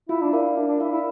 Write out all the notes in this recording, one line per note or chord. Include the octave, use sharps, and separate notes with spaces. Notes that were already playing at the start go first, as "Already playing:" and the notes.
E4 F4
D4
E4 A#4 D5 F5
D4 F4
D4
E4 A#4 D5 F5
E4